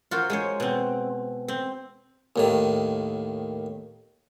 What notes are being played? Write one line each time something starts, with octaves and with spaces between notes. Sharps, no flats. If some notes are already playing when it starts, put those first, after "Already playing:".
F4 F#4 A#4 C5
G#3 C5 C#5
B2 C4
C4
D#2 A2 D#3